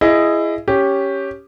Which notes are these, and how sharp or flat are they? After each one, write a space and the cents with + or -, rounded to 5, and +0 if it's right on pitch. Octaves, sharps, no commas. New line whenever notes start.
E4 +20 G#4 +0 D#5 +0
C#4 +0 G4 +0